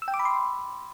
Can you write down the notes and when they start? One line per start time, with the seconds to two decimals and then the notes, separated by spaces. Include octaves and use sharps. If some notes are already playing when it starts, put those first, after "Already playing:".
0.02 E6
0.08 G5
0.14 D6
0.19 B5
0.25 C6